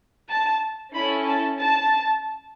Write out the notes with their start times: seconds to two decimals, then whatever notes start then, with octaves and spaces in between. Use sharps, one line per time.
0.30 A5
0.95 C#4 E4 A4 B5
1.28 A5
1.61 A5